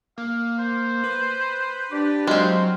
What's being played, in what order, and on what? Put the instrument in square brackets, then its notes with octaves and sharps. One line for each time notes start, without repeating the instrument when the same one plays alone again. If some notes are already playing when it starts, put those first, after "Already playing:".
[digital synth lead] A#3 [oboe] F5
[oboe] C5
[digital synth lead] B4
[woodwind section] D4 G4
[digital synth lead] F#3 [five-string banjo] G#3 C4 [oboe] F5